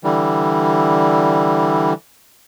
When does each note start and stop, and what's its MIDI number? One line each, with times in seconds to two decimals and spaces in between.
0.04 1.93 50
0.04 1.93 52
0.04 1.93 55